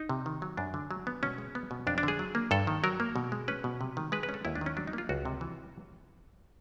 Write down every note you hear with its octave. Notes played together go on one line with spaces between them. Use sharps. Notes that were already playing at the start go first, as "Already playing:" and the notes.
Already playing: D#4
C3
D#3
F#3
F#2 D4
D3
F#3
B3
B2 C#4
G#3
B3
B2
F2 D4
D4
D3 G#4
F#3
A#3
G2 A4
D#3
F#3 A#4
A#3
B2
G#3
C#4 B4
B2
C3
D#3
G#3 B4
B4
C#4
A4
D#2 E4
D4
D#3
C#4
F#3 D4
D#4
A#3 F4
C#2 F#4
C3
E3